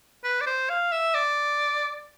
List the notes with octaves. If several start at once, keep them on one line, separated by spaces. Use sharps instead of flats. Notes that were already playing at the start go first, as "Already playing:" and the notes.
B4
D5
C5
F5
E5
D5